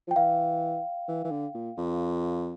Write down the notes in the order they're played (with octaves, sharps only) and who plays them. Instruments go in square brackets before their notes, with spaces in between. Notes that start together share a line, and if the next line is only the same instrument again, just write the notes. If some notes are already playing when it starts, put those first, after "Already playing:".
[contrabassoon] F3
[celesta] G5
[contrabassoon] E3 [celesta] F5
[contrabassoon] E3
E3
D3
A#2
F2